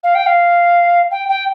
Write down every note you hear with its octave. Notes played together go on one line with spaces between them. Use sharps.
F5
G5
F5
G5
G5